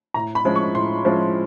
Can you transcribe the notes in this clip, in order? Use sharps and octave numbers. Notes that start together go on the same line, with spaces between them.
A2 A#5
B5
F3 G#3 C#4 E4
C#6
A2 C6
F3 G#3 C#4 E4